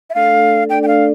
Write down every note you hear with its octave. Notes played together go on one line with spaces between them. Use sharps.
E5
A3 D4 A4 D5 F5
A3 D4 A4 D5 G5
G5
F5